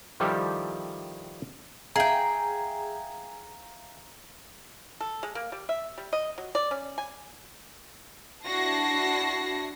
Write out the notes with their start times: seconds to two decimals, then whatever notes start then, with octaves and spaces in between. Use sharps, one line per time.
0.20 D#3 F3 G3 E4 G4 A4
1.96 G#4 E5 F5 G5 G#5 A#5
5.01 A4
5.23 G#3
5.35 A#3
5.52 G3
5.69 E5
5.98 G3
6.13 D#5
6.38 F#3
6.55 D5
6.71 C#4
6.98 G#5
8.46 D4 E4 F#4 A5 A#6 C7